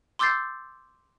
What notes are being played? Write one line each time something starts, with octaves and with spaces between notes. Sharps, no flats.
C6 D6 E6 G6 A6 C7